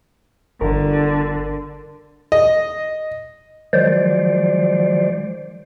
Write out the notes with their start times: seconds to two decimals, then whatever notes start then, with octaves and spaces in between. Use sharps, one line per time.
0.61 G1 D3 A#4
2.32 D#5
3.73 D#3 F3 F#3 G#3 C5 D5